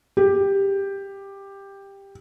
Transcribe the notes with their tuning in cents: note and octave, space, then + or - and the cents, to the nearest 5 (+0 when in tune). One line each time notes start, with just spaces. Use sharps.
G4 +10